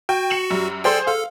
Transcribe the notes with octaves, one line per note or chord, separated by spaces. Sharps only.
F#4 G5
C#7 E7 F#7
F#2 G3
G#4 A4 C5 D5 G5 C6
A4 F5